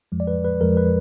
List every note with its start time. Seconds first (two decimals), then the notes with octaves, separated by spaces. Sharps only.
0.12 F2 F3 G#3
0.20 D5
0.27 B4
0.45 B4
0.61 F2 F3 G#3 A#4
0.77 B4